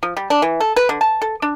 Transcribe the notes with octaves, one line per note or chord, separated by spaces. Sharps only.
F3
G3
D4
E3
A4
B4
D3
A5
A4
D4